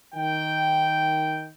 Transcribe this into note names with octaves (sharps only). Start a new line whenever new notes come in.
D#3 G5